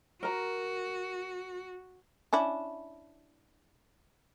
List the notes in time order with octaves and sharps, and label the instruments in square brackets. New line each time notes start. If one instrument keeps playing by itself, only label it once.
[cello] F#4 [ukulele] A#4 A#5
[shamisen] C#4 D4 E4